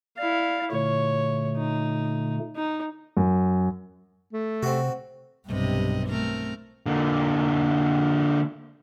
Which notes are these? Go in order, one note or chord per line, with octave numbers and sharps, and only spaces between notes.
E4 D5 F5
A#2 D3 A3 C#5
D#4
D#4
F#2
A3
C3 C4 F#4
B1 G2 C3 D#5
A3 C4 A#4
D3 A#3